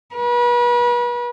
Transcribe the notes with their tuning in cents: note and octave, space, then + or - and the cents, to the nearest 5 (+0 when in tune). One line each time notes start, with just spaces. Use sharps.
B4 -35